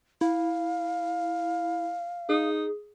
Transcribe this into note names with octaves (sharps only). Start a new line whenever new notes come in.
E4 F5
D#4 G#4